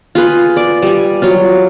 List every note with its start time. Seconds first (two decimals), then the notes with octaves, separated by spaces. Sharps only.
0.15 F4 G#4 B4
0.56 D5
0.82 G3 G#5
1.22 F#3 F4